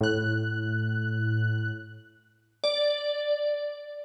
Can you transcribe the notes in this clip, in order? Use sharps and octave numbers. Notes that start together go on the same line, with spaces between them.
A2 F#6
D5